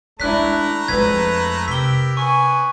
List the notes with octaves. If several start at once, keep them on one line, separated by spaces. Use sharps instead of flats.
D#3 G#3 A3 D4 E4 A#5 F#6 B6
F2 G#3 B4 G#6 B6
C3 G4 A#4 E6 B6 G7
B3 G#5 C#6